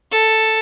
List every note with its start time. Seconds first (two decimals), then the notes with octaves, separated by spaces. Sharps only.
0.12 A4